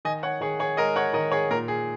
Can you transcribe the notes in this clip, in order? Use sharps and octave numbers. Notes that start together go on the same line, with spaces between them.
D#3 D#5 G#5
C#5 F#5
D#3 G#4 C#5
G#4 C#5
G#3 A#4 D#5
C#5 F#5
D#3 A#4 D#5
G#4 C#5
A#2 A#4
G#4